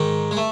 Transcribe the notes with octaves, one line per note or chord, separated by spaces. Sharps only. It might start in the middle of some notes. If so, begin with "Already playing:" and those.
Already playing: G#2 D#3
G#3
A3